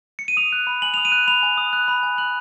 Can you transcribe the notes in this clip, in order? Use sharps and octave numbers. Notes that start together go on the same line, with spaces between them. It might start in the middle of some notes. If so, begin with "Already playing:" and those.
C#7
D#7
D#6 F7
F#6
B5
G#5 F#7
D#6 F7
D#7
F#6
B5 F7
G#5
D#6
F#6
B5
G#5
F#6 F#7